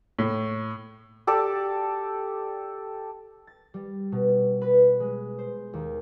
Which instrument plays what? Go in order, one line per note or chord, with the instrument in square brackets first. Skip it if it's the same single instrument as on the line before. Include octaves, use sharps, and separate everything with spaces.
[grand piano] A2
[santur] G4 A4 D5
[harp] A6
G3
B2
B4
G#3
C5
D#2